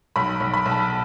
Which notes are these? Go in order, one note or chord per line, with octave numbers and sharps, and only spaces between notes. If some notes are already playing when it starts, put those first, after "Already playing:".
B1 B5
B1
B5
B1
A5